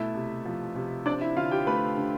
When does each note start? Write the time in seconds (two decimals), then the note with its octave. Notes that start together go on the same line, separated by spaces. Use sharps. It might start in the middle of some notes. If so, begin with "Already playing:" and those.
Already playing: B2 A3 E4 E5
0.15 C3
0.45 F3
0.75 C3
1.06 C4 D4 D5
1.21 E4 E5
1.37 D3 F4 F5
1.51 G4 G5
1.67 A3 B4 B5
1.97 D3